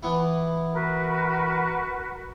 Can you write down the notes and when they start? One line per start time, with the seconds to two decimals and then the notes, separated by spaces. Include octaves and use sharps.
0.03 E3 B3 E4
0.73 F#4 A#4 B4